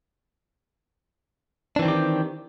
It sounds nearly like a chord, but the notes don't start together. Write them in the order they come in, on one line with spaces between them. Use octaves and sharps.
D4 E3 C4 D#3 G4